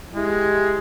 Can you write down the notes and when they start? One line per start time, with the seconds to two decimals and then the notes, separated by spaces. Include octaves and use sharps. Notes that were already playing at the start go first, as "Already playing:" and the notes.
0.14 G#3 E4 G4